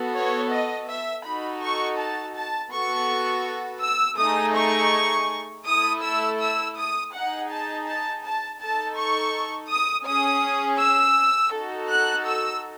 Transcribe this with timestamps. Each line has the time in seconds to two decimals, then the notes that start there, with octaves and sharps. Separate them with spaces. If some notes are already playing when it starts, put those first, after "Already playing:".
Already playing: B3 F#4 A4
0.15 C#5
0.52 D#5
0.88 E5
1.25 D#4 F#4 A4 B5
1.62 C#6
1.99 A5
2.35 A5
2.72 B3 F#4 A4 C#6
3.82 E6
4.19 A3 D#4 G#4 D#6
4.56 C#6
5.65 A3 E4 A4 D#6
6.02 E6
6.39 E6
6.76 D#6
7.12 D#4 G#4 F#5
7.49 A5
7.86 A5
8.23 A5
8.59 D#4 A4 A5
8.96 C#6
9.69 D#6
10.06 C#4 G#4 D#6
10.80 E6
11.53 D#4 F#4 A4
11.89 F#6
12.26 E6